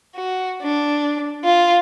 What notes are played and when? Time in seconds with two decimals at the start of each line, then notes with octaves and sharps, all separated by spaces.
0.15 F#4
0.62 D4
1.44 F4